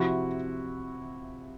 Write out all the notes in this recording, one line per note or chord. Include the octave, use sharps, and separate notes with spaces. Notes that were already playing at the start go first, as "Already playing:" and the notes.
Already playing: C3 F3 E4 F#4